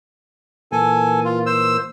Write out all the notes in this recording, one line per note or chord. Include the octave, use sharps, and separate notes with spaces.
A#2 E3 A#3 A4 G#5
F4
C5 E6